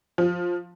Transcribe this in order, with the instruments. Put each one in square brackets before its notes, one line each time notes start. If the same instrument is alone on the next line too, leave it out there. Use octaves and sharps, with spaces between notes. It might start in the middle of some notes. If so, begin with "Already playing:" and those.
[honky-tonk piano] F3